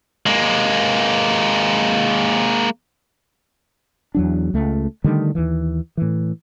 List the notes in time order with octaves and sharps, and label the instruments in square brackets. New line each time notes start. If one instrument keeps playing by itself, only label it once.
[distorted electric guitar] G#3 A#3
[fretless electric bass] E2 F#3 D4
C#2 A3
D3 D#3 G3 A3
D#2 E3
A2 E3